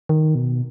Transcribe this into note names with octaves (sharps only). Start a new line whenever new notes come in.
D#3
B2